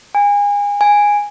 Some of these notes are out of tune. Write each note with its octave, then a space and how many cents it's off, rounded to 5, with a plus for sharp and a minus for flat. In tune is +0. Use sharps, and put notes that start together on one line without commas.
G#5 -30
G#5 -10